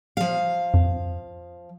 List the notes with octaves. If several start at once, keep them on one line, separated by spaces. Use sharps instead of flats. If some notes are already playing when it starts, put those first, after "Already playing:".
F3 F5
F2